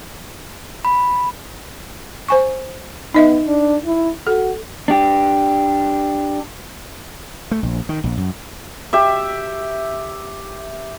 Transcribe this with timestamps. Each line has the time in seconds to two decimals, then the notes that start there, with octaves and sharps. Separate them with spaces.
0.85 B5
2.29 C5 G#5 C#6
3.14 B3 D#4 D#5 E5
3.47 D4
3.85 E4
4.27 F#4 A4
4.88 D4 G4
7.51 A3
7.63 A#1
7.89 D#3
8.04 A#1
8.17 F#2
8.93 G4 E5